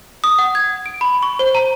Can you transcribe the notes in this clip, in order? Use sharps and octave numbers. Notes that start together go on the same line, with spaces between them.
D#6
F#5
G#6
D7
B5
C#6
C5
A#5